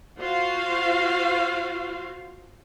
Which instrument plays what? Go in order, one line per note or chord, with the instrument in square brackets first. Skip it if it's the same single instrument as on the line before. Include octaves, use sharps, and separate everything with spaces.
[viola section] F4 F#4 C5 F5